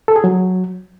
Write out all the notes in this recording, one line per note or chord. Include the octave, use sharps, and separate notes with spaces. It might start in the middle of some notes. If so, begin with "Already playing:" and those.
A4
G#4
F#3